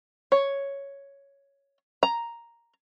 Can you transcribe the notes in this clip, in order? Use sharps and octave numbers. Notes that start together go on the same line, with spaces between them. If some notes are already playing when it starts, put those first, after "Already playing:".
C#5
A#5